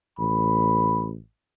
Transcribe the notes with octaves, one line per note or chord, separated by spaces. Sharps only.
A1 B5